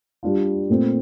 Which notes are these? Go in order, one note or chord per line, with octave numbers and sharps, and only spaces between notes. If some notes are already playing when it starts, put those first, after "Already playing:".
G3 D4 F4
A#2 A3 C4